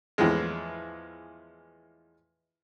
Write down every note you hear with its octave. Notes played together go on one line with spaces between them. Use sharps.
E2 A2 E3 F3 G#3